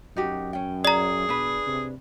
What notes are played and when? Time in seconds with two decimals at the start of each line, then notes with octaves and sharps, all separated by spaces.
0.16 F#2 D#4 F#4 G4
0.53 C#4 G5
0.85 G#4 D5 A#5
1.29 B2 D4 B4
1.67 C3